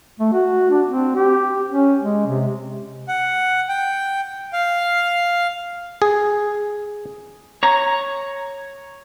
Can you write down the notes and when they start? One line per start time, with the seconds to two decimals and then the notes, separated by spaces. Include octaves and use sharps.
0.20 A3
0.33 F#4
0.71 D4
0.87 C4
1.16 G4
1.70 C#4
2.02 G#3
2.27 C3
3.08 F#5
3.69 G5
4.53 F5
6.02 G#4
7.63 C#5 A#5